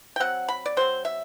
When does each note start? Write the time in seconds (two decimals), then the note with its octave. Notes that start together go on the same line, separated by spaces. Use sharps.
0.16 G5
0.20 F#3 C4 F#5
0.48 B5
0.66 D5
0.77 F#3 C4 C5
1.05 E5